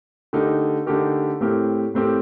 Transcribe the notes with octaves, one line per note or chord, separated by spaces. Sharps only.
D3 A3 D#4 G4 A#4
D3 A3 D#4 G4 A#4
A2 A3 C4 G4 A#4
A2 A3 C4 G4 A#4